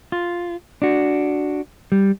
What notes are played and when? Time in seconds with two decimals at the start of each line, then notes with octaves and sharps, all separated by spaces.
0.12 F4
0.82 D4 F#4
1.92 G3